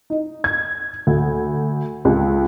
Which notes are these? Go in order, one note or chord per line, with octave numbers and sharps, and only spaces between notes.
D#4
G#6
D2
C#2